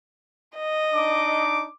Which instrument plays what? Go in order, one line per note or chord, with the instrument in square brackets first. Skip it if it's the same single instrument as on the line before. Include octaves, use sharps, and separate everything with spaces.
[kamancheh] D#5
[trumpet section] D4 D#4 D6